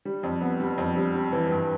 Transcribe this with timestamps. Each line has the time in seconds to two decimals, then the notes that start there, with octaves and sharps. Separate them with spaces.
0.05 G3
0.23 F2
0.41 B3
0.60 G3
0.78 F2
0.96 G3
1.14 G3
1.32 E3
1.50 G2